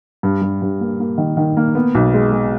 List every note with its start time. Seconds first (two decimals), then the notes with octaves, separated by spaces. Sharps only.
0.23 G2
0.42 G2
0.62 G2
0.81 A#3
1.00 A#3
1.18 D#3
1.37 D#3
1.57 A#3
1.75 B3
1.95 B1
2.14 G#3
2.32 G#3